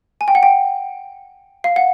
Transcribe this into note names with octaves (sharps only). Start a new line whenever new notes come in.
G#5
G5
F#5
G5
F5
F#5